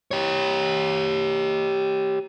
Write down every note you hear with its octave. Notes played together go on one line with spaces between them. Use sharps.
G4 C#5